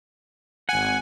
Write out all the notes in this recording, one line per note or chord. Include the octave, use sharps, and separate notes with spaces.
G#1 F#5 G#5